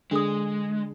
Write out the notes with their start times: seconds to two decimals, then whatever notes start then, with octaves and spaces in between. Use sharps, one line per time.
0.11 D3 G#3 D4 G#4 D#6